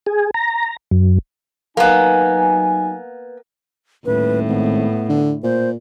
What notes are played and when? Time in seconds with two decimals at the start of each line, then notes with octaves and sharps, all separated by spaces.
0.06 G#4
0.34 A#5
0.91 F#2
1.77 F#3 A#3 B3 D#4 G#5
4.05 D#1 A2 B4
4.48 G#1 B3
5.09 D3
5.43 A#2 C5